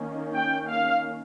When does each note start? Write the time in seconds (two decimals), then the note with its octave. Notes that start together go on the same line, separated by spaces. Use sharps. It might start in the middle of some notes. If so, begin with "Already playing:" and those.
Already playing: D#3 A#3 C#4
0.33 G5
0.66 F5